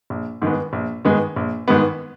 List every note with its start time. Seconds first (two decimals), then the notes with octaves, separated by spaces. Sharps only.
0.10 A#1
0.42 G#2 D#3 G#3 B3
0.73 A#1
1.05 G#2 D#3 G#3 B3
1.36 A#1
1.68 G#2 D#3 G#3 B3